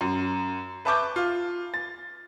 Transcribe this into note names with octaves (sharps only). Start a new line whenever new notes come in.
F#2
B4 E5 A5 C#6 D6 G6
F4
A6